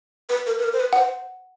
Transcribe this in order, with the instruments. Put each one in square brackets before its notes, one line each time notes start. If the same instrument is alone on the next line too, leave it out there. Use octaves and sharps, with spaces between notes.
[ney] B4
A#4
B4
A#4
C5
B4
[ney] B4 [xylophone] F#5
[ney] C5